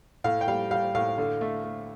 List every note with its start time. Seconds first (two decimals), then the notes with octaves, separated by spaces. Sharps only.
0.24 A2 F5
0.41 G5
0.48 G3 F5
0.71 G3 F5
0.95 A2 F5
1.18 D3
1.41 A3
1.64 A3